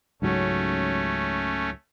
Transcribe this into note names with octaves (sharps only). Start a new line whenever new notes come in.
C#2 G#2 F#3 A3 C#4